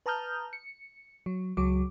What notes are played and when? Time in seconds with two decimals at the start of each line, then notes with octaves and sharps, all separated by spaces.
0.06 B4 A5 A#5 D#6 F6 G6
0.53 C#7
1.26 F#3
1.57 C#2 F#3 D6